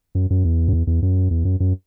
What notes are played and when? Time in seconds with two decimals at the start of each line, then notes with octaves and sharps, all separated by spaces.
0.15 F#2
0.30 F#2
0.44 E2
0.68 F#2
0.73 E2
0.87 E2
1.02 F#2
1.31 E2
1.45 F#2
1.60 F#2